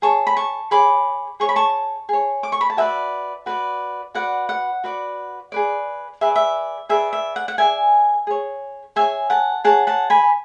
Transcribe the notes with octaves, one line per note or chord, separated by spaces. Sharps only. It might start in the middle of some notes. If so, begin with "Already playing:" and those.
G#4 C#5 A5 C#6
B5
A5 C#6
G#4 C#5 B5 D6
G#4 C#5 C#6
B5
A5 C#6
G#4 C#5
D6
C#6
B5
A5
F#4 B4 D5 E5 G#5
F#4 B4 D5
F#4 B4 D5 F#5
F#5
F#4 B4 D5
G#4 B4 D5
G#4 B4 D5 E5
E5
G#4 B4 D5 E5
E5
F#5
F#5
G#4 B4 D5 E5 G#5
G#4 C#5
G#4 C#5 E5 G#5
F#5 A5
G#4 C#5 F#5 A5
F#5 A5
G#5 B5